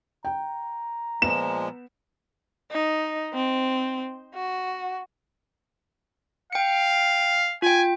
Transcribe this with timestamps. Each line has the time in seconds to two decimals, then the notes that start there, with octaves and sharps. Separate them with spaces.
0.25 G5 A#5
1.22 A#2 F3 G#3 B3 E7
2.71 D#4
3.34 C4
4.35 F#4
6.53 F5 G5 C#7
7.62 F4 G5 G#5